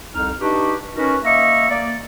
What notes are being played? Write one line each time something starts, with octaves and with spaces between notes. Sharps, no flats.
C2 F2 D#4 F6
D4 D#4 F#4 G4 B4
C#4 D#4 F#4 A#4 B4
A#3 D#5 E5 A#5 C#6
A#3 D5